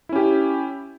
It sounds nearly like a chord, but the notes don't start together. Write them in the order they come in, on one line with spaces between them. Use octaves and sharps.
E4 C#4 G4